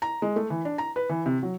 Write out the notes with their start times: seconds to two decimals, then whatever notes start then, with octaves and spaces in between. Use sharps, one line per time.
0.02 A#5
0.22 G#3
0.36 A3
0.50 E3
0.65 D4
0.78 A#5
0.96 B4
1.09 E3
1.26 C3
1.43 F#3